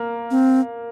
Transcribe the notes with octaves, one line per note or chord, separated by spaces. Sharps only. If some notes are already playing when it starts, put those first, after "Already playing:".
Already playing: A#3
C4